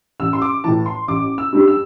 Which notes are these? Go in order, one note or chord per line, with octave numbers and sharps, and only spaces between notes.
A1 E6
C6
D6
A2 E3 A5
C6
A1 D6
E6
G2 G3 D4
E6